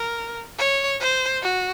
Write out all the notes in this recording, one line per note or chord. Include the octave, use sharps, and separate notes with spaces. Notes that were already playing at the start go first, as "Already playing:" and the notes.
Already playing: A#4
C#5
C5
F#4